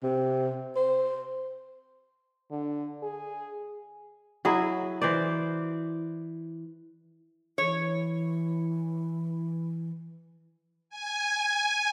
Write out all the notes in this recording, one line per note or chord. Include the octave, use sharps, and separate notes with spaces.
C3
C5
D3
G#4
F#3 E4 G#4
E3 C5 D5
E3 C#5
G#5